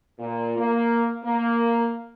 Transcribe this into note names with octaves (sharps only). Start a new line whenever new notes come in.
A#2
A#3
A#3